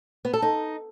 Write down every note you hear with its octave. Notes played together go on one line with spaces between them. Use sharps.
B3
A4
D#4